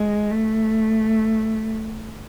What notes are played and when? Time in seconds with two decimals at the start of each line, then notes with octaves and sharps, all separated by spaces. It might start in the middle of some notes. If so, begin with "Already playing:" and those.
Already playing: G#3
0.30 A3